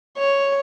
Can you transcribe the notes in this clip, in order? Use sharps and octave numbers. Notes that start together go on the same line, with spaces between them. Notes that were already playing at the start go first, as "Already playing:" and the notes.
C#5